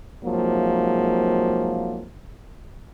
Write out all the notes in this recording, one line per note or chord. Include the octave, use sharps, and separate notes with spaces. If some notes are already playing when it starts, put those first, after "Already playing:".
G#2 C3 F3 F#3 A#3